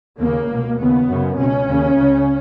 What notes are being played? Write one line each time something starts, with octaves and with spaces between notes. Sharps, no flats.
D#2 C#3 A#3
C#2 B2
D#2 C#3 B3
F#2 C#3
C#2 B2 C#4
D#2 C#3
C#2 C#3